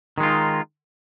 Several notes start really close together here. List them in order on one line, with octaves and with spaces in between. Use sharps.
D#3 G#3 F4 D#4